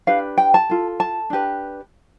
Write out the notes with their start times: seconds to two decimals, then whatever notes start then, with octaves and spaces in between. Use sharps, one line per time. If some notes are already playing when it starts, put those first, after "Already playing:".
0.07 D4 G4 B4 F5
0.38 G5
0.54 A5
0.70 F4 A4
1.00 A5
1.30 D4 G4 B4